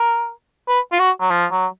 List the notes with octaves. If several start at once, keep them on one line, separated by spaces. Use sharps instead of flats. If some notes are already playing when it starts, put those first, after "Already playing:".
Already playing: A#4
B4
F4
F#4
F#3
F3
F#3